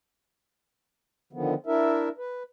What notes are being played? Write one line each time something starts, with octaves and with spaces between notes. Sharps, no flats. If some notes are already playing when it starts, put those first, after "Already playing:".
D3 D#3 F3 B3
D4 E4 A#4 E5
B4